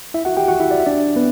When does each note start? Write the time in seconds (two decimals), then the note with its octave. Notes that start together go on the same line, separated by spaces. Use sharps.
0.14 E4 E5
0.25 F#4 F#5
0.37 G4 G5
0.48 F#4 F#5
0.60 E4 E5
0.71 D5
0.80 E5
0.86 D4 D5
1.16 B3 B4